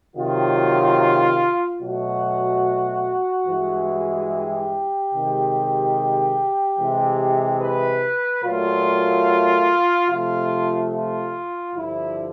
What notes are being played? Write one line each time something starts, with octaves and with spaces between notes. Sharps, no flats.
C3 D#3 F#3 F4
B2 F#3 A3 F#4
G2 E3 G#3
G4
C3 D#3 G#3
C3 E3 G#3
B4
A#2 F#3 A3 F4
C3 F3 A3 F4
F4
G2 D3 F3 E4